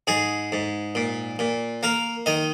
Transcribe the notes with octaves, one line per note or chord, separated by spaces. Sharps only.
G#2 G#4
G#2
A#2
A#2
A#3 A#4
D#3 D#5